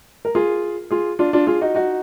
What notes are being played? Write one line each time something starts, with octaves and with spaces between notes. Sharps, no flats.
A#4
F4 G#4
F4 G#4
D4 F4
D4 F4
F4 G#4
D#4 F#4
D#4 F#4